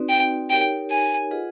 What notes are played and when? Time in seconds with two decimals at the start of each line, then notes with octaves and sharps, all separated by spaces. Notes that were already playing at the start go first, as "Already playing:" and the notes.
Already playing: C4 D#4 F#4 B4 D5
0.09 G5
0.50 D#4 G4 A#4 C#5 G5
0.91 G#5
1.31 F4 G#4 B4 D#5 F#5